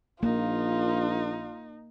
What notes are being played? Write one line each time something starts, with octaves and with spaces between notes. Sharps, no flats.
A#1 A#3 D#4 F4